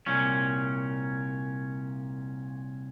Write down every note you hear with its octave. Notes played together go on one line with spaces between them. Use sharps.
C2 A#2 C#4